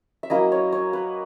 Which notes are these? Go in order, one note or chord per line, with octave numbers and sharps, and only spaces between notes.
E5
F#3 A#3 C#4 E4 D#5
C#5
C#5
B4